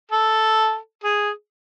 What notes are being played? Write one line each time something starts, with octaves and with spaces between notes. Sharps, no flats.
A4
G#4